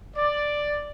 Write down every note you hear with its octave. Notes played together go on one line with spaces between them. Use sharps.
D5